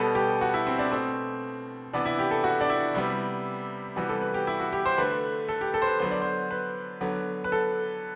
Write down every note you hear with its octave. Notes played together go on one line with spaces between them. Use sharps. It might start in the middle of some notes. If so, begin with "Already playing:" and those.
Already playing: B2 G3 B3 A4
G4
F#4
E4
C4
D4
B2 A3 C4
C3 E3 B3 D4
E4
G4
A4
F#4
D4
E4
C3 G3 B3
C3 E3 G3 B3 F#4
A4
B4
G4
E4
F#4
G4
C5
D3 A3 B4
A4
G4
A4
C5
B4
D3 F#3 B3 C5
D5
C5
B4
D3 F#3 B3
B4
A4